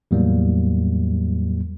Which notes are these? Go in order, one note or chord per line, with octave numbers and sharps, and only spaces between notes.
E2 A2 F#3 G3 A#3